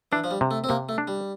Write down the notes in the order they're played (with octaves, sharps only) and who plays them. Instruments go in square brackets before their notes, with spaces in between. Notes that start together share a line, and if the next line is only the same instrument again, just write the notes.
[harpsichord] E3 [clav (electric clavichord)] D4
[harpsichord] F3
G3
[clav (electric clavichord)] C3
[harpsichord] A3
C4
[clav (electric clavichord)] C3 [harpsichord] A#3
[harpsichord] A3
[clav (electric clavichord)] D4
[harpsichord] G3